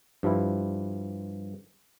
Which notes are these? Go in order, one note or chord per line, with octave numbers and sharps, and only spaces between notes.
G2 F3 G3 E4